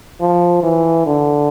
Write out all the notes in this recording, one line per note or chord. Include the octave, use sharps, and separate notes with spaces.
F3
E3
D3